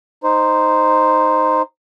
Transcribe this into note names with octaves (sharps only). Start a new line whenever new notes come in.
D#4 C5